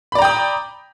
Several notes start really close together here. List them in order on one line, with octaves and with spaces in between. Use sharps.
B5 D5 A#5 G5 D#6